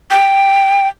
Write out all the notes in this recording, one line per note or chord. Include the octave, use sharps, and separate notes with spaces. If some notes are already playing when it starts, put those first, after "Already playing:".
G5